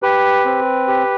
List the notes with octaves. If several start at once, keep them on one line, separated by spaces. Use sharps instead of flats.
G4 B4
C4
G4